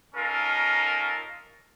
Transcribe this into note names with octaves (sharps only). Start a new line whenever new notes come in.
C#4 D#4 F4 A4 A#4